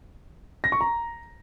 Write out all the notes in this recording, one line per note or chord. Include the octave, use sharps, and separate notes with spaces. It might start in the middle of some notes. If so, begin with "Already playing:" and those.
A#6
C#6
A#5